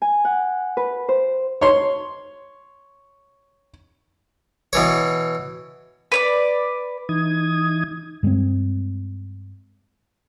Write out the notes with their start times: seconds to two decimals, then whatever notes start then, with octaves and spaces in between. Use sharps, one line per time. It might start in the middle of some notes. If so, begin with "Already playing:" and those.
0.02 G#5
0.25 F#5
0.77 B4
1.09 C5
1.61 C#5 C6
4.73 B2 E3 C#5
6.12 B4 C#5 D5
7.09 E3 D#4 D#6 G#6
8.23 G2 G#3 A3 C4